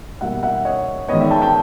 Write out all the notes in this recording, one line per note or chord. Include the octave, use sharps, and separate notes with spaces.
B2 G3 A#3 E5 F#5
E5 F#5
C#5 D#5
D#3 G#3 B3 C#5 D#5
D5 E5
G5 A5
G5 A5